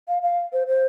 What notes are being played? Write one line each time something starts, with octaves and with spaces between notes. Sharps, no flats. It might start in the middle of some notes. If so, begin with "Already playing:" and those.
F5
F5
C5
C5